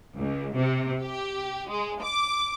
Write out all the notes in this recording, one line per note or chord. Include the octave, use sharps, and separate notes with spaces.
C#2
C3
G4
G#3
D6